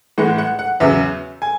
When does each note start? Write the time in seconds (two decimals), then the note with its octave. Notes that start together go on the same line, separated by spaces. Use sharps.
0.18 A2 E3 G#3 F#5
0.38 F#5
0.59 F#5
0.80 E2 C#3 F#3 E5
1.42 G#5